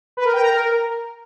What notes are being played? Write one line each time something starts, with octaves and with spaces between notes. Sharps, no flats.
B4
A#4
G5
A#5
A#4